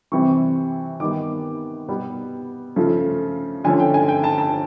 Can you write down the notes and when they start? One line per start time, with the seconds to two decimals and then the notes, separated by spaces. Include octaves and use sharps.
0.12 C3 E3 G3 C4 C#6
1.00 D#3 G3 B3 D6
1.88 B2 G3 B3
2.76 C#3 F3 A3
3.64 D3 F3 A3 C#4 G#5
3.80 G5
3.94 G#5
4.08 G5
4.24 A5
4.38 A5